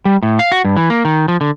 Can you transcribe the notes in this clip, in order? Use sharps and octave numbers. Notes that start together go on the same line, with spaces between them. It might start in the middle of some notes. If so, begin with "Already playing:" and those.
G3
A2
F5
F#4
G2
E3
A#3
D#3
F3
D3